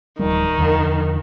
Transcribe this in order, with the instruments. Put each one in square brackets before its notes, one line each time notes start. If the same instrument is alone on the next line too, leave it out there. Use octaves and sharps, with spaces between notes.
[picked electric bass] D1 F3 G3 [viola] D#3
[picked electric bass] E2 D3 F3